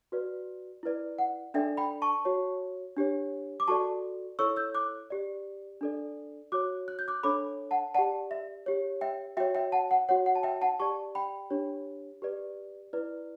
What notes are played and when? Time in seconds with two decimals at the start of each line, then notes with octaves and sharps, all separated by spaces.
0.12 F#4 B4 D5
0.83 E4 B4 D5
1.19 F#5
1.54 D4 A4 D5 E5 G5
1.77 G5 B5
2.02 A5 C#6
2.25 F#4 C#5
2.97 D4 G4 C#5
3.60 D6
3.68 F#4 A4 D5 A5 C#6
4.39 E4 A4 C#5 C#6 E6
4.56 E6 G6
4.75 D6 F#6
5.10 G4 D5
5.81 D4 A4 D5
6.52 F#4 C#5 D6 F#6
6.88 F#6
6.99 G6
7.08 D6 F#6
7.23 D4 A4 C#5 B5 D6
7.71 F#5 A5
7.94 G4 D5 F#5 A5
8.31 E5
8.66 G4 C#5
9.01 E5 G5
9.37 F#4 E5 G5
9.40 C#5
9.55 E5 G5
9.72 F#5 A5
9.91 F#5
10.09 F#4 C#5 F#5
10.26 F#5
10.35 A5
10.43 E5 G5
10.62 F#5 A5
10.80 G4 D5 A5 C#6
11.15 G5 B5
11.50 D4 G4 C#5
12.22 G4 B4 D5
12.93 E4 B4 D5